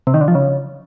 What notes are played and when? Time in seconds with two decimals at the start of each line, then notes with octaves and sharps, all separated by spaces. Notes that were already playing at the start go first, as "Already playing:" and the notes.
0.07 C3
0.14 D#3
0.21 D3
0.28 F3
0.35 C#3